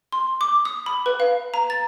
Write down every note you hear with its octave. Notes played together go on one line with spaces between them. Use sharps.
C6
D6
D#6
B5
B4
F5
A#5
A6